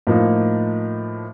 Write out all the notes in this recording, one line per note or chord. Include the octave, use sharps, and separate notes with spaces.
A2 F3 A#3 D#4